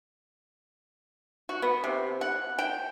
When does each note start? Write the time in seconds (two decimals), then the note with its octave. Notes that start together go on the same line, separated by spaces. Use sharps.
1.49 F#4
1.62 B3
1.84 C3
2.21 F#5
2.59 G5